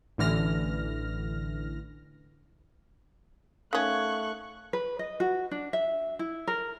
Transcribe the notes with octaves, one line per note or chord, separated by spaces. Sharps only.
A1 D3 E3 F6 A#6
D#3 A3 C#4 F5 F#5 C#6 F#6 G#6
B4
D#5
F#4
D4
E5
E4
A#4